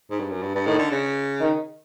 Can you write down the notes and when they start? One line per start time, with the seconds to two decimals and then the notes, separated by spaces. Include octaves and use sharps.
0.11 G#2
0.20 G2
0.30 F#2
0.42 G2
0.55 G2
0.66 A2 D#3
0.79 D3
0.91 C#3
1.41 D#3